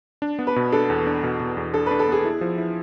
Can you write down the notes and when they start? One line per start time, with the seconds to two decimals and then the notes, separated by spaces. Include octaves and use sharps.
0.22 D4
0.39 B3
0.47 B4
0.56 B2
0.72 D4 A4
0.90 E2
1.07 D4
1.23 B2
1.40 B2
1.57 E2
1.73 D4 A4
1.86 D4 B4
1.99 A4
2.08 B3 G#4
2.25 E4
2.41 F3
2.58 E4